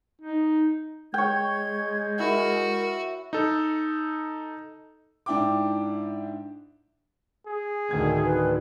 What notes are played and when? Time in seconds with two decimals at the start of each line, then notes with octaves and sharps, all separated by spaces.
0.21 D#4
1.14 G#3 C#5 G5 G#6
2.20 E4 F#4 A#4
3.33 D#4 A4
5.26 G#2 D4 E4 G5 D6
7.47 G#4
7.91 D1 D2 D#3 A3 G#6
8.25 B4